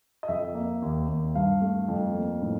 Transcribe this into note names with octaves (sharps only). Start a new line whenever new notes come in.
D#5
F2 E5
A#3
D#2
D#2
G2 F5
A3
F2
A#3
A2